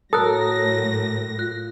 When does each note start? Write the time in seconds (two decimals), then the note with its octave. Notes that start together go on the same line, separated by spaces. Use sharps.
0.13 A2 F#3 A4 A#4 D#6 F#6 A#6
1.39 F4 F#6